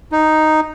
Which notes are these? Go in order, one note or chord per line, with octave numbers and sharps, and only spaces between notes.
D#4